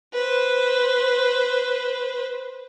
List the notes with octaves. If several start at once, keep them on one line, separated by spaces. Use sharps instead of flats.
B4 C5